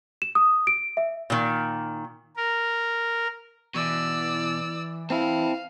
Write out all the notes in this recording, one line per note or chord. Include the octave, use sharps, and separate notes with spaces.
E7
D#6
D7
E5
A#2 D#3
A#4
B2 E3 D5 E6
C4 E4 F5 G5 A5